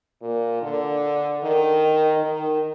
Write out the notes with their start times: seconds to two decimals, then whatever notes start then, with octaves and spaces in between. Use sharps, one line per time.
0.22 A#2
0.62 D3
1.43 D#3
2.23 D#3